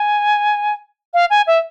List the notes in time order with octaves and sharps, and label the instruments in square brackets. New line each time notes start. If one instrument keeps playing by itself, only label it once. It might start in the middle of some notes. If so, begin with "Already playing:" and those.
Already playing: [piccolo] G#5
F5
G#5
E5